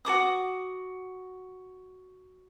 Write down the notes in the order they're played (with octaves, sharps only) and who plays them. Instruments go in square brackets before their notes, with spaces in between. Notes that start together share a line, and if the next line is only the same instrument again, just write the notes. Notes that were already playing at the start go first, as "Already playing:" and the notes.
[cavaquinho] F#4 A4 D6 D#6